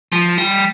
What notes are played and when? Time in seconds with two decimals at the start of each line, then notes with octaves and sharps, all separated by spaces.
0.12 F3
0.38 G3